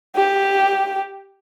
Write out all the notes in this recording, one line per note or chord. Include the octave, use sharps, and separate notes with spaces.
G4